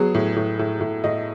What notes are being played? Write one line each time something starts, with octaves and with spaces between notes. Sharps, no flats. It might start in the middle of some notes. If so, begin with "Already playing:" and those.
Already playing: F#3 B3 G#4
A2
A2
A2
A2
A2 D#5